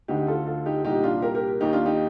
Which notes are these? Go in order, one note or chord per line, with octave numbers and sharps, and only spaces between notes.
D2 D3 D#4 G4
F4 A4
F4 A4
D#4 G4
C2 A#2 D#4 G4
D4 F4
G4 A#4
G4 A#4
D#2 D#3 D#4 G4
D4 F4
D#4 G4